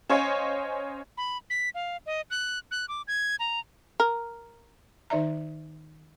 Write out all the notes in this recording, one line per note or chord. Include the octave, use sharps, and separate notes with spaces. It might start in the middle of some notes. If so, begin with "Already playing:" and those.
C#4 C5 C#5 D#5 F5 G#5
B5
B6
F5
D#5
F#6
F#6
D6
G#6
A#5
A#4
D#3 D#4 D5 E5 A#5